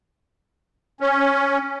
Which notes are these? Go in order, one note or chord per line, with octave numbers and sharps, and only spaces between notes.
C#4